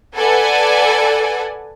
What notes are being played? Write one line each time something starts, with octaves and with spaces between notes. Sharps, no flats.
A4 B4 D5 F#5 G#5